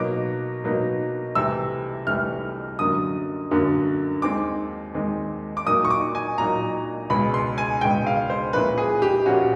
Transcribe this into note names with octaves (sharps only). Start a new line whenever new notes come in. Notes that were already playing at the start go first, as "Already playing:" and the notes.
Already playing: B2 F#3 A#3 D#4 D6
B2 F#3 A#3 D#4
C2 C3 E3 A3 E6
C2 C3 E3 A3 F6
F#2 D3 F#3 A#3 D#6
F#2 D3 F#3 A#3
D#2 D#3 G#3 C4 D6
D#2 D#3 G#3 C4
D6
A#2 F#3 A#3 D#4 D#6
C#6
D6
G#5
A#2 F#3 A#3 D#4 A#5
C#2 B2 G#3 B5
C6
G#5
C#2 B2 G#3 G5
F5
C5
A#2 F3 A#3 C#4 E4 B4
G#4
G4
A#2 F3 A#3 C#4 E4 F#4